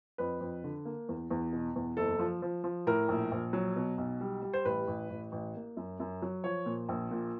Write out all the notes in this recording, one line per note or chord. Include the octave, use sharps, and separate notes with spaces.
F2 B4
F2
D3
A#3
E2
E2
B2
E2
F#1 A4
F3
F3
F3
A2 A#4
A#1
A#1
F#3
B2
B1
G3
G3
C5
A1 B4
A1
A1
A1
A#3
F#2
F#2
F#3
F3 C#5
A#2
A#1
A#2